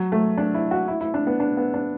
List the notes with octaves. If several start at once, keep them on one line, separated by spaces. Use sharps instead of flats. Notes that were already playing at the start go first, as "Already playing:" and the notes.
Already playing: F#3
A3
D4
E4
F#4
E4
E4
D4
B3
D4
B3
D4